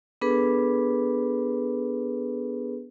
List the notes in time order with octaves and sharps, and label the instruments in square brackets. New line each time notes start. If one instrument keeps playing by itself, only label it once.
[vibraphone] B3 D4 G#4 A4 B4